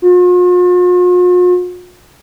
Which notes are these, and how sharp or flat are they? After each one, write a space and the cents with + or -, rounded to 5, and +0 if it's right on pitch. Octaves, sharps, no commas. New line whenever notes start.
F4 +45